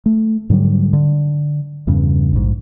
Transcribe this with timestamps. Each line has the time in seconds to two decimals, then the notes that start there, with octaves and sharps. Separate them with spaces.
0.06 A3
0.50 G#2 D3 F#3 G3
0.93 D3
1.87 E2 G2 C#3
2.33 A#1 G#2